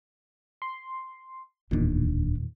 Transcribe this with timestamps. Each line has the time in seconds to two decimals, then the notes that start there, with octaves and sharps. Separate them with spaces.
0.62 C6
1.71 D1 E2 A#2 D#3 D4